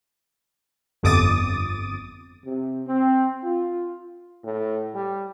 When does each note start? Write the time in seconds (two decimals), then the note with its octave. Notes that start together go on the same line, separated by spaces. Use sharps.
1.03 G1 F2 D6 D#6 A6 D#7
2.46 C3
2.87 C4
3.44 F4
4.44 A2
4.94 G3